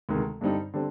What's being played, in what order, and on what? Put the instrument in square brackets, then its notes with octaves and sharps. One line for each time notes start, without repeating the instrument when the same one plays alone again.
[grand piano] D2 C3 D#3 G#3
G2 D3 G3 C4 D#4
D3 G3 C4